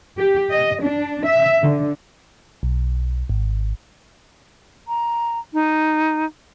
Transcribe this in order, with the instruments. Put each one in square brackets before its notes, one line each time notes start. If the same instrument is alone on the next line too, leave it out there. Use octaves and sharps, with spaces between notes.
[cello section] G4
D#5
D4
E5
D3
[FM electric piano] B1
G#1
[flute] A#5
D#4